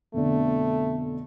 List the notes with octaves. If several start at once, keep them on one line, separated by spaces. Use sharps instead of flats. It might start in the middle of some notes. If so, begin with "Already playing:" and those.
F2 B2 D3 A3